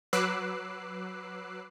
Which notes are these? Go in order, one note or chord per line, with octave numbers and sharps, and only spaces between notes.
F#3 B4 D6 E6 F#6 C7